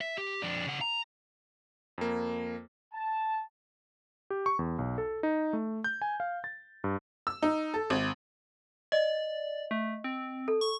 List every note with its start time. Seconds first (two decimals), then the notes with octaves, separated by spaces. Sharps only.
0.01 E5
0.18 G4
0.42 F2 D4
0.67 C#3 F#5
0.81 A#5
1.98 F2 A#3
2.93 A5
4.30 G4
4.46 C#6
4.59 E2
4.79 B1
4.98 A4
5.23 D#4
5.53 A3
5.84 G6
6.02 G#5
6.20 F5
6.44 A6
6.84 G2
7.27 E6
7.43 D#4
7.74 A4
7.90 G#1
8.92 D5 D#5
9.71 A3
10.04 C4
10.48 A4
10.61 C#6